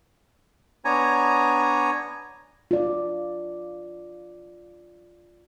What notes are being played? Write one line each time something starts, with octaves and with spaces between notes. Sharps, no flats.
B3 D4 C#5 G#5 A#5
F4 D5